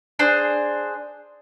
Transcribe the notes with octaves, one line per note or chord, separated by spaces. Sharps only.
D4 G#4 C5